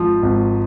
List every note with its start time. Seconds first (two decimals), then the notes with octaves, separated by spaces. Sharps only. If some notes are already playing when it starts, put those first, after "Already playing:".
Already playing: G#1 G#2 F3
0.23 G#1